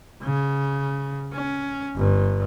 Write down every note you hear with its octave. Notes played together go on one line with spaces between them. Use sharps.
C#3
C#4
G1 G2